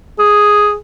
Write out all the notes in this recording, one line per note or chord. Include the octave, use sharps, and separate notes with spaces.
G#4